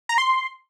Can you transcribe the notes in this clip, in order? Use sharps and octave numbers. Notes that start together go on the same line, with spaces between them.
A#5
C6